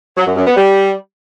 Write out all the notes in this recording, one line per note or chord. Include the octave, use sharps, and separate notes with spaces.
F#3
F#2
F#2
B3
G3